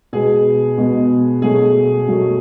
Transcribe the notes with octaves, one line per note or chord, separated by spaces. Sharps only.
B2 G#3 B3 G#4
B2 G#3 B3
B2 F#3 A3 G#4
B2 F#3 A3